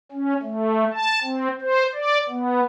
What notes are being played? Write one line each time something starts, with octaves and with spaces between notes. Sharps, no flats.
C#4
A3
A5
C4
C5
D5
B3